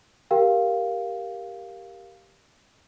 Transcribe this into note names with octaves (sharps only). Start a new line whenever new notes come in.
G4 A#4 F5 G5